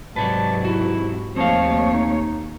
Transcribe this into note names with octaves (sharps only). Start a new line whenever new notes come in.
G#2 C3 F#3 B4 C#5 D5 A5
E4 F#4
D#2 F3 A3 C4 C#5 F5
D#4